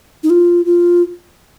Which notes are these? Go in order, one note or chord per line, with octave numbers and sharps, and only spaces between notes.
D#4
F4
F4